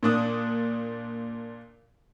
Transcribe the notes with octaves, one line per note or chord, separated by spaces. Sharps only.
A#2 D4 D#6